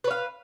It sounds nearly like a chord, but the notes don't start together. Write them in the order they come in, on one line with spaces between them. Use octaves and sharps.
B4 C#5 F5